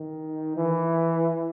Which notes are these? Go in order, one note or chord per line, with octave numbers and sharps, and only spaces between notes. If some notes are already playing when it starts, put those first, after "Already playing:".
Already playing: D#3
E3